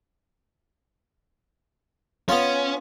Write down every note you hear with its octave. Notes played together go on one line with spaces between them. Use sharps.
B3 C#4 F4